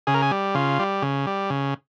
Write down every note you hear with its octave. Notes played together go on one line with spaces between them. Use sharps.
C#3 G#4
A#4
G#4
G3
C#3 F4
G3
C#3
G3
C#3